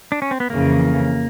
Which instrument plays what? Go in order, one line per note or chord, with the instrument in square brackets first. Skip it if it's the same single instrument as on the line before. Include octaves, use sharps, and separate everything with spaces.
[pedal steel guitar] D4
C#4
C4
B3
[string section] F2 C#3 E3 [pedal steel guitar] A#3